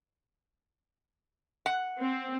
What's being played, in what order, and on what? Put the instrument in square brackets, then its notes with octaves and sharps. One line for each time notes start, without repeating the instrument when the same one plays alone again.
[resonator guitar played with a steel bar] F#5
[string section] C4